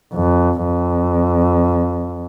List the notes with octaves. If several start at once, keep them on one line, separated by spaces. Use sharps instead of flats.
F2
F2